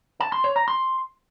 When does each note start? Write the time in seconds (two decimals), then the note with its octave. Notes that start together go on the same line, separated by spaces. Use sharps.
0.20 A5
0.32 C6
0.44 C#5
0.56 A#5
0.68 C6